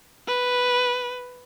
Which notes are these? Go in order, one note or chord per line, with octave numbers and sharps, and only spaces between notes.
B4